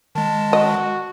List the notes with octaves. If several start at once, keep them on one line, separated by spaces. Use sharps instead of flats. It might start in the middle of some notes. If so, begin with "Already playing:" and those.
D#3 G#3 A5
F#4 D#5